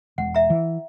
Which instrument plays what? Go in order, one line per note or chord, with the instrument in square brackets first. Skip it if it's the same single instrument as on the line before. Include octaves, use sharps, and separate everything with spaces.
[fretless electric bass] E1 [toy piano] F#5
[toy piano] E5 A#5
[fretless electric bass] E3